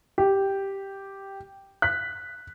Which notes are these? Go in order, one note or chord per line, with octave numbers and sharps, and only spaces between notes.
G4
F#6 B6